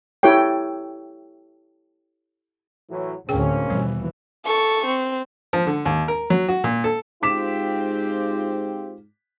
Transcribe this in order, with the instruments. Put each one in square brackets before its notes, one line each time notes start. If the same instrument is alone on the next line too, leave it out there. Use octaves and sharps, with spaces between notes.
[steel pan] E4 G4 A4 C#5 G5
[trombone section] A2 E3 F#3
[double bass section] D2 A2 [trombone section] A#3 C4 C#4 [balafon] G#4 G5
[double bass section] D#2 B2 E3 [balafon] G3 C5
[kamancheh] A4 C#6
C4
[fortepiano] F3
D3
D#2
A#4
F#3
F#4
A#2
A4
[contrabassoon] G#2 [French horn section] C4 F4 G4 [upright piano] D6 B6 E7